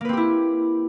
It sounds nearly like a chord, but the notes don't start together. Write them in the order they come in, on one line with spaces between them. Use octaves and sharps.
A#3 B4 C4 G4 E4